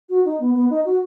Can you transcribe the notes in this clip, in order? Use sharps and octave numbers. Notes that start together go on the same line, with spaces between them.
F#4
D#4
B3
B3
D#4
F#4